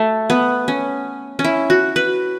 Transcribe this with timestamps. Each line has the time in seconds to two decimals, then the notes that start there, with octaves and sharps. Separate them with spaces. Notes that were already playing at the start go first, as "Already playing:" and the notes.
Already playing: A3
0.30 B3
0.68 C#4
1.39 C#4
1.44 E4
1.70 F#4
1.96 B4